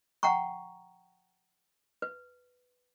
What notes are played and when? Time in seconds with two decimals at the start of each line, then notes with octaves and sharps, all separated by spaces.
0.23 F#5 G5 A#5 C#6
2.02 B4